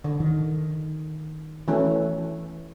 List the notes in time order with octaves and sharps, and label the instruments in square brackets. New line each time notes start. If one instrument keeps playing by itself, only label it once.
[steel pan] D3
[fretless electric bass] D#3
[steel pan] E3 A3 C#4